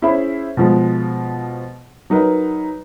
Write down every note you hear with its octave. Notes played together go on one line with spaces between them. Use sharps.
C#4 E4 G#4 C5 E5 B5
B2 F3 G#3
F#3 D#4 A#4 B4 D#5